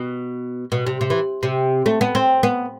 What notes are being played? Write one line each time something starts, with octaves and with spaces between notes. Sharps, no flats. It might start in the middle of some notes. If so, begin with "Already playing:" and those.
Already playing: B2
B2
C3
C3
E3
C3
A3
B3
C4
B3